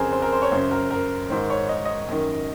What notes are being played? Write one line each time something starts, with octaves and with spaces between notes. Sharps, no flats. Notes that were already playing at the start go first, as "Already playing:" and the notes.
Already playing: F2 C#3 G#4 A#4 C5
C5
A#4
C5
C#5
F#2 C#3 C5
A#4
A#4
G#2 D#3 C5
C#5
D#5
D#5
F#2 D#3